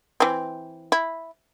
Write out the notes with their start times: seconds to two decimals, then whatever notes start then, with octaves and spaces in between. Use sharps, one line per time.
0.20 E3 C4
0.92 E4